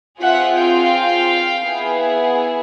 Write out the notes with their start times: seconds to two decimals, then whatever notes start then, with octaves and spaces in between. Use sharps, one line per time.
0.21 C4 F4 G#4 E5 F#5
0.57 F5 G5
1.64 B3 E4 G#4